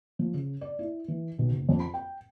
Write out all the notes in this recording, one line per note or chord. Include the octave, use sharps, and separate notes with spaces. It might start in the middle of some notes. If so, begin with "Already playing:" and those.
F3
C#3
D5
E4
E3
B1
F#1
F2
B5
G5